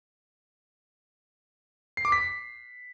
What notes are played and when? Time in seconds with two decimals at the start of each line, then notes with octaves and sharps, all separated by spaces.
1.97 C7
2.05 D6
2.12 B6